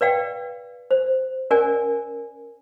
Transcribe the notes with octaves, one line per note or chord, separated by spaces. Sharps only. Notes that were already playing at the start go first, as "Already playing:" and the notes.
B4 D5 F5 G5
C5
C#4 A#4 D5 G#5